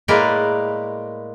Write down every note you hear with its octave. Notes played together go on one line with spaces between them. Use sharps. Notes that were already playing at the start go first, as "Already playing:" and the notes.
A2 G#3 A#3 A#4 B4 D5